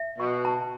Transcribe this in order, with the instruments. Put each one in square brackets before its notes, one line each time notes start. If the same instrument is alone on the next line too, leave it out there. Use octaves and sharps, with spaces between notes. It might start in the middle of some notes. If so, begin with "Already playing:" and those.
Already playing: [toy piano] E5
[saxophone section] B2 [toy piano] C#6
[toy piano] A5